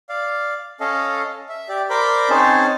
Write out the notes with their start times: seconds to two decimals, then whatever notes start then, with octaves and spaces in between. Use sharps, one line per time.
0.09 D5 F5
0.80 C#4 A4 D#5 F5
1.49 E5
1.69 G4 D5
1.90 A#4 C5 D5 B5 D6 G6
2.30 C4 C#4 D#4 G#4 C5 A5